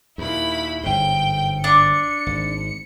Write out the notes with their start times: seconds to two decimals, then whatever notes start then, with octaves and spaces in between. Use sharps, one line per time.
0.18 D#2 A#2 E4 B5
0.83 G1 G#2 G5 G6
1.64 D4 C#7
2.26 G#1